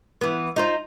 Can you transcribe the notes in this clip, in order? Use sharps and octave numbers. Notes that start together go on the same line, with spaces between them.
E3 B3
D#4 F4 C5